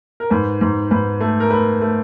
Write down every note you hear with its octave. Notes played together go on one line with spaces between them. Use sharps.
A#4
G#2 B4
G#2
G#2 B4
A3
A#4
A3 B4
A3